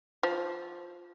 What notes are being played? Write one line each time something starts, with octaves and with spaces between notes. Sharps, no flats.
F3